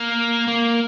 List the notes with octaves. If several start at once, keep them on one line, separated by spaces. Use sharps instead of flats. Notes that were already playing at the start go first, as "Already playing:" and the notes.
Already playing: A#3
A#3